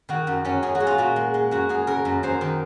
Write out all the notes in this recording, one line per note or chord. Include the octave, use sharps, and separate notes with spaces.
D#3 F#4
F#2
F#2 C#4
F#2 G#4
F#4
G#3
F4
A#2 F#4
G#3
G#3
F#2 F#4
F#2 G#4
C#3 A#4
F#2
F#2 C5
D#3